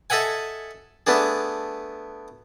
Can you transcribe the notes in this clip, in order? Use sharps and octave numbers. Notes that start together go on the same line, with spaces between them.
A4 D#5 E5 F#5 G#5
A3 B3 D4 G#4